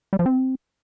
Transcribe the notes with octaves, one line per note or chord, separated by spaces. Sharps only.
G3
F3
C4